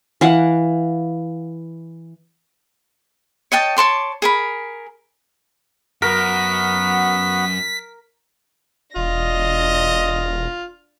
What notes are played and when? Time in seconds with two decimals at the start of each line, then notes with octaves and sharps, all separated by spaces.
0.21 E3 F5 F#5
3.52 C#5 D#5 G5 A5
3.77 C#5 A5 C6 D6
4.22 G#4 A#4 B5
6.02 F#2 B3 F#4 A#4 F#5 B6
8.96 E1 D4 F4 D#5 A#6